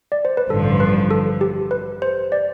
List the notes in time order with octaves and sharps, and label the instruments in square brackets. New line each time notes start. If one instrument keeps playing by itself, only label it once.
[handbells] D5
C5
B4
[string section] A1 G2 D3 F3 [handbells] A4
[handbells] B4
A4
G4
B4
C5
D5